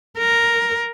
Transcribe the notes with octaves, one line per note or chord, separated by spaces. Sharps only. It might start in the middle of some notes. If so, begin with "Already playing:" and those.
A#4